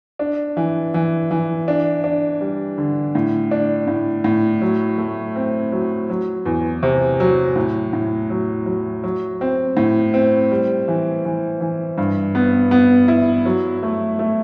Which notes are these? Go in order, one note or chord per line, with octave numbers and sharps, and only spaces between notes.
D4
E3
E3
E3
D4
D4
G3
D3
A2
D4
A2
A2
F#3
A3
C4
F#3
F#3
E2
C3
F#3
A2
A2
F#3
F#3
F#3
C4
A2
C4
G3
E3
E3
E3
G2
B3
B3
E4
F#3
A3
A3